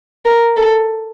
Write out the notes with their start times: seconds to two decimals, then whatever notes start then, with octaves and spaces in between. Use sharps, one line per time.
0.25 A#4
0.57 A4